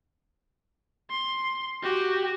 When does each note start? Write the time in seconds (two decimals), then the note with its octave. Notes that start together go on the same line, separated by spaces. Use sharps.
1.10 C6
1.82 F#4 G4